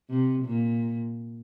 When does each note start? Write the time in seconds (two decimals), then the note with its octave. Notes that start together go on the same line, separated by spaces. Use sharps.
0.10 C3
0.45 A#2